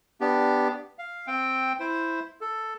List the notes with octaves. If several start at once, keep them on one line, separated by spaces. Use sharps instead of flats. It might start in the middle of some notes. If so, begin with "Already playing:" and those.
B3 D4 G4
F5
C4 G5
E4 C5
A4